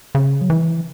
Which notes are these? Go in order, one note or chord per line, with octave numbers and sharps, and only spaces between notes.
C#3
F#3
E3